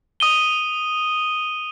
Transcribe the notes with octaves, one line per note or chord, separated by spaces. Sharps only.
D#6 D#7 G7